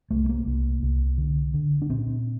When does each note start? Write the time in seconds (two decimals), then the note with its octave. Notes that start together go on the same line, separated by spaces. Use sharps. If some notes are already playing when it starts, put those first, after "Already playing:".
0.11 C2 A3
0.24 A3
0.29 A#3
0.46 C2
0.83 C2
1.18 D3
1.54 D3
1.82 D4
1.89 A#2 C4